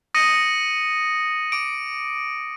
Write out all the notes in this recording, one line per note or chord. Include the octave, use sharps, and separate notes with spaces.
D#6 A#6 C#7 D#7
D6 D7